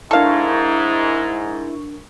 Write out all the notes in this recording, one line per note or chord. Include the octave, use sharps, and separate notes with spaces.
G#2 D4 E4 A4 A#4 F5 C#6